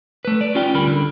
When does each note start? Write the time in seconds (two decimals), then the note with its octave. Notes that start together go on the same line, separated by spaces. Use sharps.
0.25 A3 B4
0.41 D5
0.55 C#4 F4 G4 G5
0.74 D2 G3 A#4 B5
0.87 D3